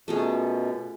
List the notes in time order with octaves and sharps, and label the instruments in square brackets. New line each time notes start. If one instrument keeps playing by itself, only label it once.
[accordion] F#2 B2 [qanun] A3 F4 G#4